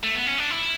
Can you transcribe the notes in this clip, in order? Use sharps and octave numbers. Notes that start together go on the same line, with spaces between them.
A3
B3
C#4
D4
E4